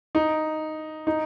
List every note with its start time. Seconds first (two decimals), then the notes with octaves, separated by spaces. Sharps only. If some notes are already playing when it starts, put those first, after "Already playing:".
0.15 D#4
1.07 D#4